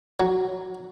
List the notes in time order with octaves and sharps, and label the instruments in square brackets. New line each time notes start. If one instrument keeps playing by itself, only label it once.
[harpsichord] F#3